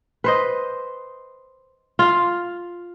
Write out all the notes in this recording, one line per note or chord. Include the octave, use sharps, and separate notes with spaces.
B4 C5 D#5
F4 F5